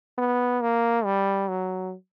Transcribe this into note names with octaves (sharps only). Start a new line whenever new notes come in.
B3
A#3
G3
F#3